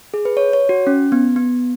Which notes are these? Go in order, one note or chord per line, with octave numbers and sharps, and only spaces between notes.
G#4
B4
C#5
C#5
F#4
C#4
B3
B3